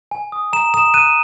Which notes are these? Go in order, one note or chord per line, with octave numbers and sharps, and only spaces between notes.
G#5
D#6
A#5 E7
D#6 E7
F#6 D#7